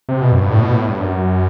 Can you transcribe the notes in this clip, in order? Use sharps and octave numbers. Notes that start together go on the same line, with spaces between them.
C3
B2
F#2
G2
A2
B2
A2
G2
F#2